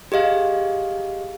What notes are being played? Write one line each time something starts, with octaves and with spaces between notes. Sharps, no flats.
G4 G#4 D#5 F5